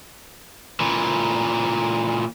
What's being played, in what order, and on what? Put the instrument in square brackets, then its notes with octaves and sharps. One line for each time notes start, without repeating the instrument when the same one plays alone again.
[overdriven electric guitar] A#2 E3